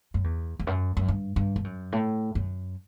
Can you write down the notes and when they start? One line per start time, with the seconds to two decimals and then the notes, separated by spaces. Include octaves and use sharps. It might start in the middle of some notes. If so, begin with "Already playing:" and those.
0.14 F#2
0.24 E2
0.59 E2
0.67 F#2
0.97 F#2
1.08 G2
1.36 G2
1.56 G2
1.64 F#2
1.92 A2
2.35 F#2